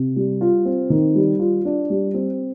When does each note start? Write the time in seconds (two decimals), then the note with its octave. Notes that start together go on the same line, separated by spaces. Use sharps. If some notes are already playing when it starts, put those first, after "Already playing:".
Already playing: C3
0.16 G3
0.41 F4
0.65 C4
0.90 D#3
1.15 G3
1.39 F4
1.65 D4
1.90 G3
2.14 C4